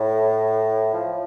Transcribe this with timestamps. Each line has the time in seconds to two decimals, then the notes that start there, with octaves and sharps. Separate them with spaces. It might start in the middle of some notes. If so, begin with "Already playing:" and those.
Already playing: A2
0.94 F3